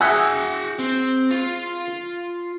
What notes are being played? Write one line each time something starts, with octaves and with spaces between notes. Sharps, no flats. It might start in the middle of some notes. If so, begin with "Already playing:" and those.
F#4 G#4 E5 F#5 G5
C4
F4